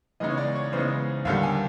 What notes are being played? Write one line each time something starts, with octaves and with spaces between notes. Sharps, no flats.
C#3 E3 G#3 B3 D#4 D#5
C#5
D5
C#5
C#3 E3 G#3 B3 D#4 C5
D#2 D3 G3 F5
G#5